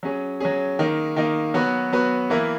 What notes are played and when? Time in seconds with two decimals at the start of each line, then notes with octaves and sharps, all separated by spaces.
0.03 F#3 C#4 G#4
0.40 F#3 C#4 G#4
0.79 D#3 A#3 D#4
1.16 D#3 A#3 D#4
1.54 F#3 B3 F#4 B4
1.92 F#3 B3 F#4 B4
2.30 E3 A#3 E4 A#4